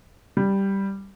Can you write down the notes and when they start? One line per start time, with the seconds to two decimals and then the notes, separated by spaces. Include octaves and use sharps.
0.37 G3